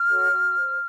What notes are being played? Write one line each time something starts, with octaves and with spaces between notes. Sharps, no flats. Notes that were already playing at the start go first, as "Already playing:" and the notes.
Already playing: F6
F#4 A4 C#5
F#4
C5